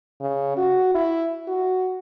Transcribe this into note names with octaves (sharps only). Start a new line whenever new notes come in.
C#3
F#4
E4
F#4